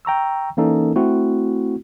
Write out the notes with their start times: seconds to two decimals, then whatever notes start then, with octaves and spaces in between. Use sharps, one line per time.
0.05 G5 A#5 C#6 E6
0.57 E3 A#3 C#4 D#4 A4 A#4
0.96 A3 C4 E4 F#4